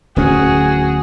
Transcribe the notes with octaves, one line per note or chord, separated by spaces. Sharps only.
D1 C#4 F#4 G#4